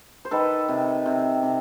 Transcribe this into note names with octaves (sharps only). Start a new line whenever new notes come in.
C5
D#3 A4 B4
C3
C3
C3